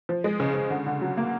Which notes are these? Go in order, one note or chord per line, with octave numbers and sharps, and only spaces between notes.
F3
G#3
C#3
C#3
D3
D3
F#3
A#3